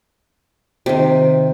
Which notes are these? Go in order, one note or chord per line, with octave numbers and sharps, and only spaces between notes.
C3 D#3